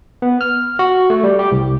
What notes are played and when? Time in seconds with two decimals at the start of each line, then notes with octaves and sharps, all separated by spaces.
0.22 B3
0.41 F6
0.79 F#4
1.10 A3
1.24 G3
1.39 G4
1.52 C2